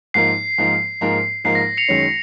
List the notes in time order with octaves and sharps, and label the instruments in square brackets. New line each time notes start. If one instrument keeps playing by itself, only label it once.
[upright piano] G#2 F3 A#3 D#4 A#4 [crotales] C7
[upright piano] G#2 F3 A#3 D#4 A#4
G#2 F3 A#3 D#4 A#4
[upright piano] G#2 F3 A#3 D#4 A#4 [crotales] C7
[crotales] A#6
C#7 F7
[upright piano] F#2 D#3 G#3 C#4